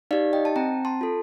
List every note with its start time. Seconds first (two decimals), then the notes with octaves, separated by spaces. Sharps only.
0.11 D#4 G4 D5 F5
0.33 D#5 G5
0.45 A5
0.56 C4 G5 A#5
0.85 A5 C6
1.01 F4 A4